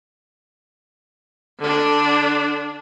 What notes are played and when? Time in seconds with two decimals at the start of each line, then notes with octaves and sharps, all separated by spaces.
1.59 D3 D4